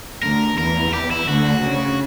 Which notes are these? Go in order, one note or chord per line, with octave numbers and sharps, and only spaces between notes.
D2 D3 A#4
E2 E3 A#4
G4
E4
D2 D3 F#4
C#3